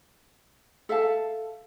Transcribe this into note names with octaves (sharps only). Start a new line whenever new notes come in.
A4 E5 F5 A5